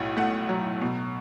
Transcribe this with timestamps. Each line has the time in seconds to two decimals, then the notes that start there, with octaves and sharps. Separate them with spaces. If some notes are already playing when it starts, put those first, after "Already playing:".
Already playing: B1 A2 F#5
0.17 A3 F#5
0.49 F#3
0.81 B2